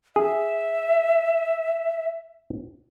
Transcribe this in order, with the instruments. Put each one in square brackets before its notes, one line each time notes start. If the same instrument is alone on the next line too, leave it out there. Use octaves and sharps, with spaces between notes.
[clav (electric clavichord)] G#4 [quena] E5